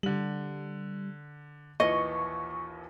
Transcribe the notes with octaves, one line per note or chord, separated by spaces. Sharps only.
D3 G3 F#7
A#1 D#2 E3 D#5 C#6